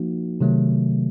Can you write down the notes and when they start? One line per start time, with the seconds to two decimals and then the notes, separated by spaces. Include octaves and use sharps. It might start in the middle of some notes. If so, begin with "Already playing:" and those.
Already playing: F3 A#3 D#4 F#4
0.41 C3 D#3 F#3 A3